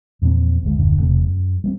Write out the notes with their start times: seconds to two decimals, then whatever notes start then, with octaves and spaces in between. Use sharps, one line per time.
0.22 E2 A#2 F3 C4
0.63 G#1 D2 G#3
0.77 D#1 F#2 D3 D4
1.00 E1 C3 A3
1.25 F#2
1.64 G3 A#3 C4